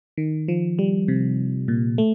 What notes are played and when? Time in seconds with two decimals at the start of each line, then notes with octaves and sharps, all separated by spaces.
0.17 D#3
0.48 F3
0.79 G3
1.08 C3
1.68 A#2
1.98 A3